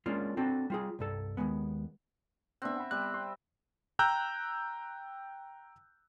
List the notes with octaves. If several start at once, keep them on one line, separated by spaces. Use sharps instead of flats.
G#3 A#3 C#4 D4 F4
C4 D4 F#4 A4
G3 F4 G#4
C2 G2 A4
D#2 B2 G#3 B3
B3 C4 D4 E5 F#6
F#5 B5
G3 B3 F#6
C6
G5 A#5 E6 F#6 G6